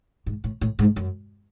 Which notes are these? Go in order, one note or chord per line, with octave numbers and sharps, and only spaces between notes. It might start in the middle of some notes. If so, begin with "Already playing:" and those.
G#2
A2
A2
G#2
F#2